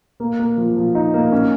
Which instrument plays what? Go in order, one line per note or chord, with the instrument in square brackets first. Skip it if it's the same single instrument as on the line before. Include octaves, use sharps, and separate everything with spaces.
[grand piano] A#3
A#3
F3
F3
D#4
A#3
C#4